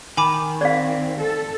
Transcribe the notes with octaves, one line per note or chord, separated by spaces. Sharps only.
D#3 G#5 B5 D6
C4 D5 F5
A4